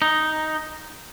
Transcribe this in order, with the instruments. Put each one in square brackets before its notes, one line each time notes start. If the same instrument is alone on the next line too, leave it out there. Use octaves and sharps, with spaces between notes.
[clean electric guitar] D#4